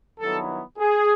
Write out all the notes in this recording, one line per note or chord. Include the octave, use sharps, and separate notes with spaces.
G2 D#3 F#3 B3 E4 A4
G#4